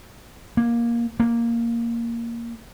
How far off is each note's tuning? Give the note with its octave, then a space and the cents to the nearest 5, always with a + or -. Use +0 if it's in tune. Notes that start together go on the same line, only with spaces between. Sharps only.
A#3 +10
A#3 +0